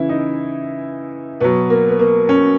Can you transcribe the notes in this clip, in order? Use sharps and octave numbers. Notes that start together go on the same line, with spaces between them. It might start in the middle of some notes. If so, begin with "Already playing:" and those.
Already playing: C#3 E3 E4
D#4
B2 F#3 B3
A#3
B3
A#3
C#4